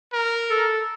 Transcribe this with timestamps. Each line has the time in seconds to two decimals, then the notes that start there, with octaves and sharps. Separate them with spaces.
0.13 A#4
0.50 A4